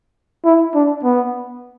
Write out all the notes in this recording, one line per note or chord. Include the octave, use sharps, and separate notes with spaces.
E4
D4
B3